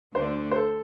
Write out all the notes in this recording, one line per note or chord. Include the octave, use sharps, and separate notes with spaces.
D2 D3 A3 D4 C5
C5
A4